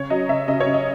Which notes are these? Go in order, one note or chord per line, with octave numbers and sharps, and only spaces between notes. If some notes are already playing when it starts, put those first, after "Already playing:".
Already playing: C#3 C#5
F#3 D#5
C#3 E5
C#3 D#5
C#5
C#3
D#5